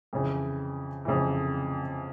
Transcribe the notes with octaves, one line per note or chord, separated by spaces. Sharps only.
F2 C#3 E3
F2 C#3 E3